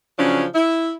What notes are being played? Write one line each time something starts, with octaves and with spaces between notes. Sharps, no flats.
C#3 F3 F#3 C#4 D4
E4